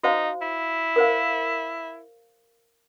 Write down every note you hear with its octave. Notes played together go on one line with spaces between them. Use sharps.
D#4 F#4 C5 F5
E4
A#4 C5 F5